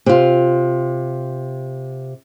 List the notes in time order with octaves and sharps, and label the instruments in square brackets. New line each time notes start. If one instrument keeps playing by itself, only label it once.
[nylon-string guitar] C3 F4